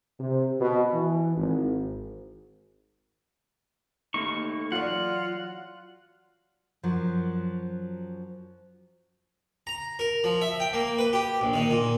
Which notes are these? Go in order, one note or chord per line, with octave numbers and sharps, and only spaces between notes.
C3
B2
E3
G#1
A3 A#3 D#4 C#6
E3 F#3 F4 D5 F#5
F#2 F3 F#3
A#5
A#4
F3
E5
G5
A#3
B4
G4
A#1
D#3
A#2